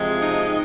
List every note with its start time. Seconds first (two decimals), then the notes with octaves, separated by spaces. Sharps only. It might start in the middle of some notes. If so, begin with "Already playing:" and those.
Already playing: C3 F3 G#3
0.22 D#4